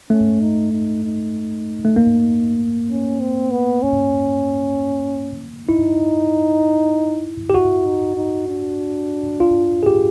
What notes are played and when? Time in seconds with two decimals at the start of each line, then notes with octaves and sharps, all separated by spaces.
0.10 A3 C#4
0.41 D#4
0.72 D#4
1.04 D#4
1.85 A3
1.96 A#3
2.90 C#4
3.20 C4
3.51 B3
3.82 C#4
5.68 D#4 E4
7.50 G4
7.54 E4 F#4
7.85 D#4
8.16 D#4
8.48 D4
9.40 F4
9.83 G#4
9.86 G4